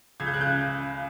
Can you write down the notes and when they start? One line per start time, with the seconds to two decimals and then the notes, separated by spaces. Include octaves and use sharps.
0.20 C#2 G#6
0.27 G6
0.34 C#3 F#6
0.41 G6